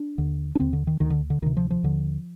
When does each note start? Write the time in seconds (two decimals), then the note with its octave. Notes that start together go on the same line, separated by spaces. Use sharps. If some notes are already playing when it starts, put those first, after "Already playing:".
Already playing: D4
0.18 D#2 D3
0.55 D4
0.59 D#2 D3 C4
0.73 D3
0.87 D#3
1.00 D2 D3 D#3
1.10 D3
1.30 D3
1.42 D2 C3 D#3
1.57 F3
1.70 F3
1.83 D#2 D3